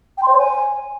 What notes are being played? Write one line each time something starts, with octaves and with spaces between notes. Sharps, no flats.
G5
C6
C5
C#5
G#5